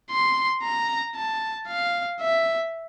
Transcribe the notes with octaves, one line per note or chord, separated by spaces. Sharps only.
C6
A#5
A5
F5
E5